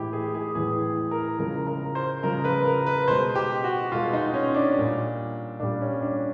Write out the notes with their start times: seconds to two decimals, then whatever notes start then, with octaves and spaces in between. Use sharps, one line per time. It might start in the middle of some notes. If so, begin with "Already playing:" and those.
Already playing: A2 E3 G#3 E4 G4
0.13 G#4
0.34 G#4
0.55 A2 E3 G#3 G#4
1.11 A#4
1.39 C#3 F3 G#3 A#4
1.67 A#4
1.95 C5
2.23 C#3 F3 G#3 A#4
2.44 B4
2.65 A#4
2.86 B4
3.08 B2 G#3 C5
3.35 G4
3.64 F#4
3.92 B2 G#3 F4
4.13 D#4
4.34 C#4
4.54 D4
4.76 A#2 G3
5.60 A#2 G3 D4
5.81 C#4
6.02 D4